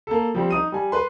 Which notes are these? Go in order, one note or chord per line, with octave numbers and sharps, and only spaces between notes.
A#3 A4
F3 G3 C4
D#4 D#6 D#7
G3 G#5
B4 C6